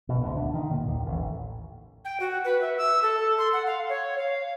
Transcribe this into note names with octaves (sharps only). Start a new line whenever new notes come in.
B2
D2
D3
D#3
A#2
D#2
A1
G5
F#4
B4
E5
E6
A4
C6
F#5
F5
C#5
F5